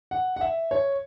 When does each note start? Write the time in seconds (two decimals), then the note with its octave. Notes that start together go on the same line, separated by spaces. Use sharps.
0.11 F#5
0.36 F#5
0.41 E5
0.71 C#5